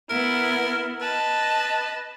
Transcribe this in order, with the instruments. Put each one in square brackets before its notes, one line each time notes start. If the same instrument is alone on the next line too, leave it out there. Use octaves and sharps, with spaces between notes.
[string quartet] B3 E4 [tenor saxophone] A#4
[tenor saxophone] B4 [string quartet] D#5 A5